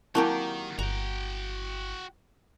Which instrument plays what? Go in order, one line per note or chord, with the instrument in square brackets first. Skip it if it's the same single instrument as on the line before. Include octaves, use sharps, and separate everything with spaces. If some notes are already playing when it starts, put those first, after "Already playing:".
[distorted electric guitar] D#3 [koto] F#3 A#3 G4 [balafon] C4 E4 A5
[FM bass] G1 [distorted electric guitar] F#4 G5 [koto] A#5